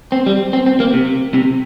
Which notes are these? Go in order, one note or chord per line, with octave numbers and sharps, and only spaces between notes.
C4
G3
C4
C4
A#3
C3
C3